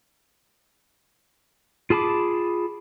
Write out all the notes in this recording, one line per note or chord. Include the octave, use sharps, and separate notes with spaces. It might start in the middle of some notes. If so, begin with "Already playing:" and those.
F4 G#4 A5 B5 D6